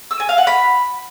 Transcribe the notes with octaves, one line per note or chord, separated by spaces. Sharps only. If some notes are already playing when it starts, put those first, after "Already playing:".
E6
G#5
F5
F#5
B5